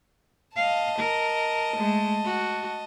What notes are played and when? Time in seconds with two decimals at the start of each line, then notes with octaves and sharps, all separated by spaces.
0.56 D#5 F5 A5
0.99 A#4
1.76 G#3 A3
2.25 F#4